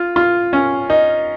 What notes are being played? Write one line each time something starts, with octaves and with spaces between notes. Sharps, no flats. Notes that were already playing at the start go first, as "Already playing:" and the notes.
Already playing: F4
F4
C#4
D#4